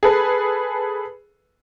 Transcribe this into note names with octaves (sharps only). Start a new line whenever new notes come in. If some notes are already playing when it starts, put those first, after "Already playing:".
G#4 A4 B4